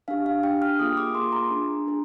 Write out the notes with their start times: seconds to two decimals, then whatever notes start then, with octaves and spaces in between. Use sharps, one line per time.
0.08 D4 G4 F5
0.26 F5
0.43 D4 G4 G5
0.62 F6
0.79 A#3 F4 G#4 D#6
0.97 D6
1.15 A#3 F4 G#4 C6
1.32 A#5
1.50 D4 G#4
1.87 D4 G#4